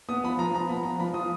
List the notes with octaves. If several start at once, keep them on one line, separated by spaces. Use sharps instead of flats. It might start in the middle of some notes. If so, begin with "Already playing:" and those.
B3 D#6
F3 B5
F3 A#5
F3 A#5
B3 B5
F3 A#5
F3 B5
F3 D#6